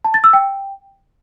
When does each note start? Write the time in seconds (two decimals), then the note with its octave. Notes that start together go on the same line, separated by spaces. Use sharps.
0.04 A5
0.14 A6
0.24 E6
0.33 G5